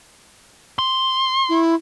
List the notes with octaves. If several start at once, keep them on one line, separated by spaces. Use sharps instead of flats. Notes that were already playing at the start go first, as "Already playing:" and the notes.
C6
E4